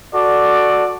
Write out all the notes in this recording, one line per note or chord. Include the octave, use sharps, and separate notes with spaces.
F#4 A4 D5